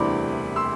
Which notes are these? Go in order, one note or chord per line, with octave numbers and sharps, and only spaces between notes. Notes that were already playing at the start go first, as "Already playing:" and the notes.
Already playing: E1 D2 C3 E3 G3 B5 C6 D6
C6 E6